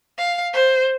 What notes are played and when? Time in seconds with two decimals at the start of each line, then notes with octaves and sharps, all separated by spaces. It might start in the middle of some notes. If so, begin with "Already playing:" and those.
0.18 F5
0.53 C5